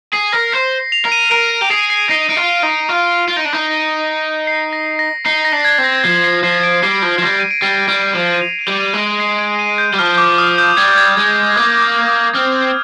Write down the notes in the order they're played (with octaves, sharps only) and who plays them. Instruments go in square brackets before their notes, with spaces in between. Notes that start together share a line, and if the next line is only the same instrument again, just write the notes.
[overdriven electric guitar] G#4 [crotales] C7
[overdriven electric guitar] A#4 [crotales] A#6
[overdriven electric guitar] C5 [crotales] C7
[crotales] F7
[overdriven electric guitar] A#4
[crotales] D#7
[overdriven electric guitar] A#4 [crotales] D7
[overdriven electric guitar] G4
[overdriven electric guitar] G#4 [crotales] C7
[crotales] C7
[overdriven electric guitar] D#4 [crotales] C7
[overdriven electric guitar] D#4 [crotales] D7
[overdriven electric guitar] F4
[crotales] D#7
[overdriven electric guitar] D#4
[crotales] C7
[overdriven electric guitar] F4
F4
D#4
D4
D#4
[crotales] C7
A#6
A#6
[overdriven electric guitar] D#4 [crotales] C7
[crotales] A#6
[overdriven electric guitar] D4
[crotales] G#6
[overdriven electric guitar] C4
[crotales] A#6
[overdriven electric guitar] F3 [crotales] C7
[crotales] C7
[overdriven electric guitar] F3 [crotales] C7
[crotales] D7
[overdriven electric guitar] G3 [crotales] C7
[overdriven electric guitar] F3
F3
[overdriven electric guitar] G3 [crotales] A#6
[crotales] D#7
D7
[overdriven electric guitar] G3 [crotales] C7
[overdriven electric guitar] G3
[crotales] D#7
[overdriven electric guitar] F3
[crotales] D#7
F7
D#7
[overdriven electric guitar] G3
[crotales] D#7
[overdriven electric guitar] G#3
[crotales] D7
C7
D7
D#7
G6
[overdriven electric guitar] G3
[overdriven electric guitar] F3 [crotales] F6
[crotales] D6
D#6
G6
[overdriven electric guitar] G3 [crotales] G#6
[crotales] G#6
[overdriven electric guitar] G#3 [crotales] G#6
[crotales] G6
[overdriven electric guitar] A#3 [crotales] D#6
[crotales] D#6
D#6
[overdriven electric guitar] C4 [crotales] F6